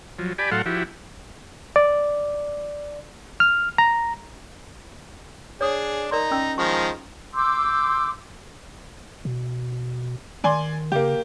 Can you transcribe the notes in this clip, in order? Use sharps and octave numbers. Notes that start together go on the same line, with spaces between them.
F3 F#3
G4 D5 G#5 B5
A2 F#3 A4 F5 F#5 C6
F3 E4 F#4 G4
D5
F6
A#5
D4 G#4 C#5 D#6
D#4 A#4 D5 C6
C#4 E6
D#3 F3 G#3 C#6
C6 D6 E6 G6
B2
D#3 D5 G#5 C6
C#3 A#3 G4